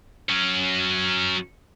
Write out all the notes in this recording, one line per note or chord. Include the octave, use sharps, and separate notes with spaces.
F#3 C#4